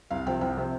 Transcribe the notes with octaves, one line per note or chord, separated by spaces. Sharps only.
C2 F5
C3 F3 C4 G5
C2 G5
C3 F3 C4